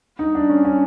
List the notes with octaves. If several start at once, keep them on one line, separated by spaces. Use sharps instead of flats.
D#4
D4
C#4
C#4